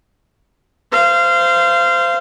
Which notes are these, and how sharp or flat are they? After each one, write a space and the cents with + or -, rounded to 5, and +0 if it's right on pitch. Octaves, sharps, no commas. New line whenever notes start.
C5 -15 F5 -25